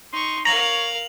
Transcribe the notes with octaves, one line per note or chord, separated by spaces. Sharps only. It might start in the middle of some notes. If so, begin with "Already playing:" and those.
D#4 C6 C#6
A#4 C#5 F5 A#5 F7 F#7